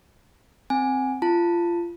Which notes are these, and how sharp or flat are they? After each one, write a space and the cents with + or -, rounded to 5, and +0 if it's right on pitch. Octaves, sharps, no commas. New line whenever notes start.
C4 +0 G#5 +0
F4 -25 A5 +20